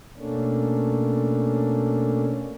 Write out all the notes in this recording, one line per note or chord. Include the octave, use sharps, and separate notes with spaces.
B2 A3 A#3 C#4 D4